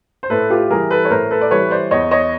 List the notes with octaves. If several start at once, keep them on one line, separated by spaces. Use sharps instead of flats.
C5
A2 A4 B4
F4 G4
E3 G3 G#4 A#4
A4 B4
C#5
A2 A#4 C5
A4 B4
D5
E3 G3 B4 C#5
C5 D5
E2 C#5 D#5
C#5 D#5